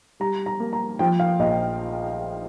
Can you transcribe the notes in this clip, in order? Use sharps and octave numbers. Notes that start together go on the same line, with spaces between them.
G3 A#5
A#5
A#3
A#5
F3 G5
F5
A#1 D#5